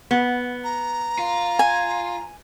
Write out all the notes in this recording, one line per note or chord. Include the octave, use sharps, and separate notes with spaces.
B3
A#5
F4
G#5